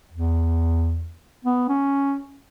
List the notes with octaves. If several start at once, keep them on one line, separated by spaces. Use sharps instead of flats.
E2
B3
C#4